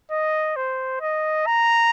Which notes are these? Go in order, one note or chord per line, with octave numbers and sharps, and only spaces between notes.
D#5
C5
D#5
A#5